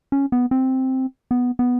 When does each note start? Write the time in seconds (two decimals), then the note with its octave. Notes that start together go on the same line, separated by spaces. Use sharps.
0.12 C#4
0.32 B3
0.51 C4
1.31 B3
1.59 B3